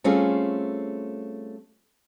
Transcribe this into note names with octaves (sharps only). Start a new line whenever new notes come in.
G3 A3 C4 C#4 F4 G#4